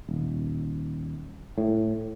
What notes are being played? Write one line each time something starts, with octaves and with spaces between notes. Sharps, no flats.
D#1
A2